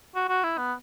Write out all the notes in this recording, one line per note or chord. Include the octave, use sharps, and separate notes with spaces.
F#4
F#4
E4
B3